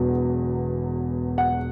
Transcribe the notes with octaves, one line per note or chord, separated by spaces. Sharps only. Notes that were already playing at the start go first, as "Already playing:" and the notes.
Already playing: E1 E2 F#3
F#5